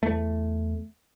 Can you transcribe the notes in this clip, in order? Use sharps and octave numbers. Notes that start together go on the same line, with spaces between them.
E2 A3